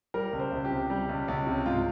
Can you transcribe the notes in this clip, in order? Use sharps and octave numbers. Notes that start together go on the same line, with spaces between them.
G3 A#4
C#2
C5
C#2
G4
C3
G3
C#2
C#2
C3
G#2 F4